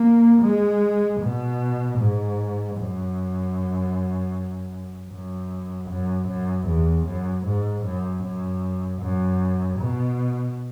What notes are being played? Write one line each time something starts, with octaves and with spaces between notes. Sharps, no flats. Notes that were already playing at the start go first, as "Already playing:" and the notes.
Already playing: A#3
G#3
B2
G#2
F#2
F#2
F#2
F#2
E2
F#2
G#2
F#2
F#2
F#2
B2